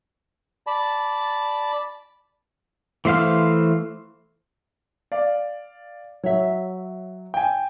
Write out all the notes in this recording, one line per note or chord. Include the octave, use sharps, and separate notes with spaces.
D5 A5 B5
E3 A3 C5 F5 F6
D5 F5
F#3 C#5 E5
G5 G#5